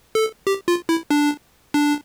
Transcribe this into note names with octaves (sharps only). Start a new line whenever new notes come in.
A4
G4
F4
E4
D4
D4